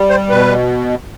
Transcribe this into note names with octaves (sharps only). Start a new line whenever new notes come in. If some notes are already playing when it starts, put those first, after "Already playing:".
Already playing: G3
C5
B2 B4